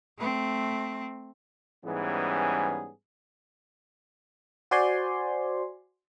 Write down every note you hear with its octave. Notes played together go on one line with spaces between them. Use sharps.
A3 C4
G#2 E3 G3 B3 C#4 G#4
F#4 C5 D5 G#5 C6